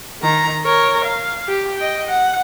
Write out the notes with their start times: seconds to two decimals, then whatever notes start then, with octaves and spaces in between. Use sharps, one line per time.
0.22 D#3 A#5
0.64 A#4 C#5
1.05 F5
1.48 G4
1.77 D#5 G5
2.07 F#5